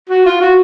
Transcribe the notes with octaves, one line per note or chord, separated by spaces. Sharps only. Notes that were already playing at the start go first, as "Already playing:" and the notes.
F#4
F4
F#4